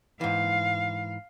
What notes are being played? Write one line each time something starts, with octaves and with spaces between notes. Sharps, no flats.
G#2 E3 F5